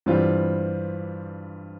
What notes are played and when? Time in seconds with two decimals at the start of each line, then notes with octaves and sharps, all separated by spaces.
0.06 G2 E3 G3 C4 F4